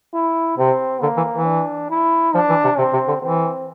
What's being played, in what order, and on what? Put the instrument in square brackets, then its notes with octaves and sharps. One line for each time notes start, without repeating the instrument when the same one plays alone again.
[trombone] E4
[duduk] C3 [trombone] C4
[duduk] D3 [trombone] A#3
[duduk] E3
E3
[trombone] D4
E4
[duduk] F3 [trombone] D4
[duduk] E3
C3
[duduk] C3 [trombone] C4
[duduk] C3
D3
[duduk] E3 [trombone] C4